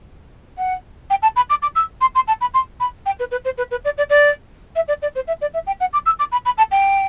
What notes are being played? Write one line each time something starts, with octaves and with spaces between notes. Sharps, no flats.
F#5
G5
A5
B5
D6
D6
E6
C6
C6
A5
B5
C6
B5
G5
B4
B4
C5
B4
B4
D5
D5
D5
E5
D5
D5
C5
E5
D5
E5
G5
F#5
D6
E6
D6
B5
B5
A5
G5